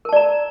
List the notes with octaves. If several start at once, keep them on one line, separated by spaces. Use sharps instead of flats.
A#4 D5 A5 A#5